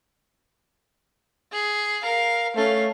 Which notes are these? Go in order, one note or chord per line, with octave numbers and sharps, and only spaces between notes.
G#4
A#4 F5
A3 C#4 F5